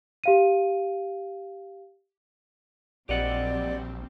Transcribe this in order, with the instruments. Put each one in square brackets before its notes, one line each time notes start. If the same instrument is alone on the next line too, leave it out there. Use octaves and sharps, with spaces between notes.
[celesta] G4 F5 D#7
[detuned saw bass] A#1 [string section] F#3 G3 C4 [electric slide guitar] G4 D#5 F#5 [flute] D5